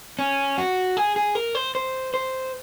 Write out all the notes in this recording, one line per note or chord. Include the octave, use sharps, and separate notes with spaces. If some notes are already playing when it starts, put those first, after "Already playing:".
C#4
F#4
G#4
G#4
A#4
C5
C5
C5